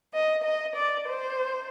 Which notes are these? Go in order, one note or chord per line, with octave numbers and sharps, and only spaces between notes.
D#5
D#5
D5
C5